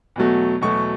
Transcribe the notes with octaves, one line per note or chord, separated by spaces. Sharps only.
E2 B2 F#3 A3
E2 B2 F#3 A3 C#6